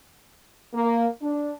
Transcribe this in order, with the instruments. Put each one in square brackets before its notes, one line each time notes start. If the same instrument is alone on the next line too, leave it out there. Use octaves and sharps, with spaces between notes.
[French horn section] A#3
D4